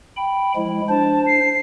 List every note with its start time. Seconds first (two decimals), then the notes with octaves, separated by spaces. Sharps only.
0.17 G5 B5
0.56 F3 G#3 E4
0.89 D4 C5 A5
1.26 C7